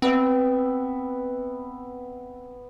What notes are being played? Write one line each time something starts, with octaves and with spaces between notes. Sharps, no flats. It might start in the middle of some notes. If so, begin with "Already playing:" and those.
B3 C4 E5